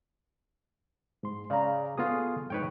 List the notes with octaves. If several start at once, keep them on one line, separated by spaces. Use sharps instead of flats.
G#2 C6
C#3 D5 F5 A#5
B3 F4 F#4 G#4 A4 D#6
F2 G#2 D#4 B4 C#5 G5